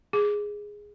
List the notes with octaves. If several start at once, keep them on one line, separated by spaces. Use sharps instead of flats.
G#4